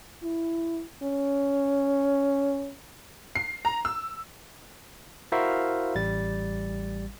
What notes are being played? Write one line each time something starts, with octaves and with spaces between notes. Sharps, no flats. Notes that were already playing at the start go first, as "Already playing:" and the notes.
E4
C#4
C7
A#5
E6
E4 F#4 A#4 C5 E5 F5
A1 G3 A6